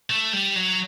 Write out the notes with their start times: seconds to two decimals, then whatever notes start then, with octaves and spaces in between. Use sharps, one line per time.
0.10 A3
0.33 G3
0.56 F#3